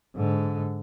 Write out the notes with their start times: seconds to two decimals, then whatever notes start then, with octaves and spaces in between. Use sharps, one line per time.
0.16 G#2 D3